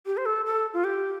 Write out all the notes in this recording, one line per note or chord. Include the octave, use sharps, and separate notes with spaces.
G4
C5
A4
A4
F4
G4